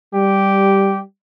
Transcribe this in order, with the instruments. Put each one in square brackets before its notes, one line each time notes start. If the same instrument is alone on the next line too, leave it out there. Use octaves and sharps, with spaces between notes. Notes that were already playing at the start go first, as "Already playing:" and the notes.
[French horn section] G3 [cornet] G4